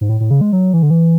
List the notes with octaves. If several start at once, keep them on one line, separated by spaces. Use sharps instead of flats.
G#2
A2
A2
C#3
G#3
F#3
E3
D3
E3